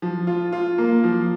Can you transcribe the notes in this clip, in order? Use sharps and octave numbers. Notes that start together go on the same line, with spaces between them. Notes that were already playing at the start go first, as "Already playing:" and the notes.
F3
F4
F4
A#3
F3